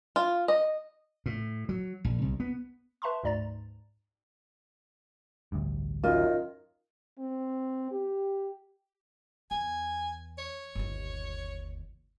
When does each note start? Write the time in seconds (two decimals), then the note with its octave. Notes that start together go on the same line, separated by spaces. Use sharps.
0.16 F4
0.48 D#5
1.26 A2
1.69 F#3
2.04 A#1
2.22 C2
2.40 B3
3.02 B4 E5 A5 A#5 C6 C#6
3.23 D2 G#2 D5 A#5 A6
5.52 A1 D2 G2
6.04 F#2 D#3 F4
7.19 C4
7.91 G4
9.51 E2 G#5
10.38 C#5
10.75 G1 D#2